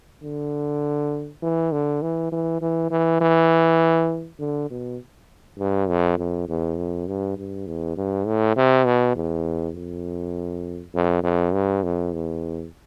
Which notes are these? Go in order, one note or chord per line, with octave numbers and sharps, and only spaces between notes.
D3
E3
D3
E3
E3
E3
E3
E3
D3
B2
G2
F2
F2
E2
F2
G2
G2
E2
G2
A2
C3
B2
E2
F2
F2
F2
G2
F2
E2